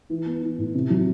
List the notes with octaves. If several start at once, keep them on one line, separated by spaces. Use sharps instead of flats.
E3
B3
E3
A2
C3
F#3